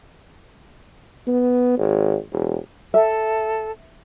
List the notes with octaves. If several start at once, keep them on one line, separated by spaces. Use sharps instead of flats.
B3
G#1
E1
A4 E5